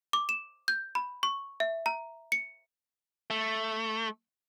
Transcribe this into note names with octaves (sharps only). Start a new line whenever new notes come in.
D6
E7
G6
B5
C#6
E5
A#5
C#7
A3